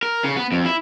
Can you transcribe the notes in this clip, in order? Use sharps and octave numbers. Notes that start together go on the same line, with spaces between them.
A#4
C#3
B3
F2
E4